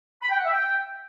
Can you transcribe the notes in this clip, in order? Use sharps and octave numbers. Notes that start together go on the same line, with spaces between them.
B5
G5
F#5
E5
G5